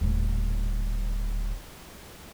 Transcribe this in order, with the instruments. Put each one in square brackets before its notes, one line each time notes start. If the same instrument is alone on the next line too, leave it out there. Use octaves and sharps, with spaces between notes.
[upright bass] D#1 A2